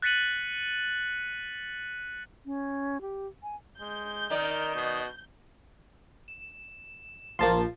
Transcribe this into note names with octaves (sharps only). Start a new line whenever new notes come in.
F#6 A6 B6 C#7 D#7 F#7
C#4
G4
G#5
G#3 G6
D#3 A#4 D5
B2
E7
A#1 F3 A#3 A5 C6